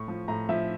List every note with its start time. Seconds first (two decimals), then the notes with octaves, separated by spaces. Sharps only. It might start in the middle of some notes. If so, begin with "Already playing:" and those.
Already playing: A2 C#6
0.08 F3
0.28 A2 A#5
0.49 F3 E5